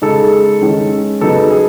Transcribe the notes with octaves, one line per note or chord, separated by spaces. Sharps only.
C#3 G#3 D#4 A4
D#3 G#3 C#4
C#3 F#3 B3 D#4 A4
G#4